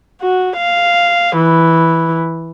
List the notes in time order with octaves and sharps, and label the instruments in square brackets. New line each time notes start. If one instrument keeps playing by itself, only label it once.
[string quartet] F#4
F5
E3